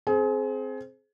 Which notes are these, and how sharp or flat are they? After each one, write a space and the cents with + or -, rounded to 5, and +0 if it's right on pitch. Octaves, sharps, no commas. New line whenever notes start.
C4 +0 G#4 +30